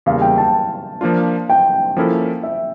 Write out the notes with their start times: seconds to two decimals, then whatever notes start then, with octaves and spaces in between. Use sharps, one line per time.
0.06 E2 C#3 G3 A#3 F5
0.22 G5
0.38 A5
1.01 F3 A#3 D4 F4
1.50 G5
1.97 F3 A#3 C#4 E4 A4
2.43 E5